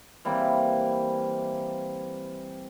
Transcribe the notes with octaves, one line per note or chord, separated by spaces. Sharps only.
E3 G3 A#3 C4